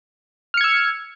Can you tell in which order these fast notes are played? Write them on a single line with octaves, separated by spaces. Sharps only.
F6 C#7 G#6 E6